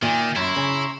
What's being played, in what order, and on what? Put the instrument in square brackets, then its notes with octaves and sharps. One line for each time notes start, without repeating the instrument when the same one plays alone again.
[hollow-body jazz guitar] A#2 [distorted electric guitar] D#3 [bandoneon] D5 E5
[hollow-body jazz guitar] F#2 [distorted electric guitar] E4 [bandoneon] A#5 C6 C#6
[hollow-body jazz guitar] C#3